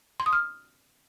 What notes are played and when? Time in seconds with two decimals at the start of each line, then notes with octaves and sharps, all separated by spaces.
0.20 C6
0.26 D#6
0.33 F6